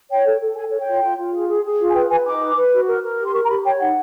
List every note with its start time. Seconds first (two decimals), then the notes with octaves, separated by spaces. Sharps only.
0.10 C#5 G5
0.25 A4
0.40 A4
0.56 A4 G#5
0.71 C#5
0.78 G5
0.86 F4
1.03 F4
1.17 F4
1.33 G#4
1.49 G#4
1.65 G#4
1.79 F4
1.89 G#5
1.94 B4 G5
2.10 B4 G#5
2.25 D#4 D6
2.41 B4
2.56 B4
2.73 F#4
2.87 A#4
3.03 A#4
3.18 G4
3.25 C6
3.33 A#4 C#6
3.43 A#5
3.49 G4 B5
3.64 C#5 G5
3.80 D#4 F#5